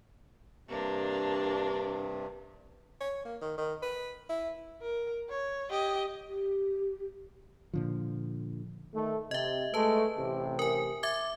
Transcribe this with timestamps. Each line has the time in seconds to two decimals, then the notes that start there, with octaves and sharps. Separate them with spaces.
0.68 G2 C3 A#3 D4
3.01 C#5
3.25 A#3
3.41 D#3
3.58 D#3
3.82 B4
4.29 E4
4.82 A#4
5.29 C#5
5.70 G4 D#5
6.28 G4
7.74 A#2 D3 F3
8.95 D#3 A3
9.31 C3 D#5 E5
9.74 G#3 A3 B4 A5
10.18 A1 C3
10.59 A#4 G#5
11.03 E5 D6 G#6